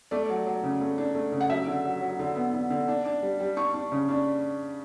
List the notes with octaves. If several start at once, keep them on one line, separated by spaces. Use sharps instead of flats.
A3 D5
F#3
F#3
C#3
A3
D4
A3
C#3
F#5
F#3 E5
D3
F#3
F#3
D3
B3
D3
D3
D4
D4
G3
G3
D4 C#6
D4
C#3
D4